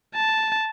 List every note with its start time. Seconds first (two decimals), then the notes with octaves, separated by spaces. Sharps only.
0.15 A5